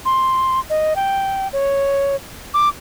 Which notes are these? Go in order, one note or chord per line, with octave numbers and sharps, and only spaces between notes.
C6
D#5
G5
C#5
D6